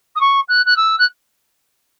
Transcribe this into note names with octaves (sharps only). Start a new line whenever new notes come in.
D#6
C#6
F#6
F#6
E6
F#6